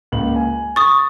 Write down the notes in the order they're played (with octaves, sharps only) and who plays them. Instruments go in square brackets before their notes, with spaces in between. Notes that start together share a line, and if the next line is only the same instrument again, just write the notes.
[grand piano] C#2 A#3 F#7
G#5
[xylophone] C#6 D#6 [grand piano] A6